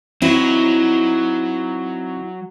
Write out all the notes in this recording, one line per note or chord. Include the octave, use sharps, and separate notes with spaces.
F#3 C4 D#4 E4